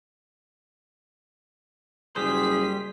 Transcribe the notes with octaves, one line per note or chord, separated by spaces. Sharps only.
F#1 G3 G#4 C5 B6